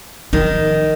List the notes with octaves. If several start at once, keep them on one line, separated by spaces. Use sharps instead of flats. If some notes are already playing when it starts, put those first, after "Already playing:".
D#3 F3 D#4